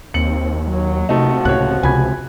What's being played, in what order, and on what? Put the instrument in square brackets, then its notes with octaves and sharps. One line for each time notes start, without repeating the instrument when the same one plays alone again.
[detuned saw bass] D#2 [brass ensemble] A#3 C4 [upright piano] C#7 F#7
[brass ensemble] F#3
[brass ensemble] A#1 F3 F#4 [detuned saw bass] C3 [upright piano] A3 D#4
[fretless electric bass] C#2 A2 [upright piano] C#5 F#6
[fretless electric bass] C#2 [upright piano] G#5 B5 G#6